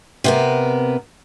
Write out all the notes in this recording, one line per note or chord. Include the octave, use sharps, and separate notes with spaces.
C3 B3 A#4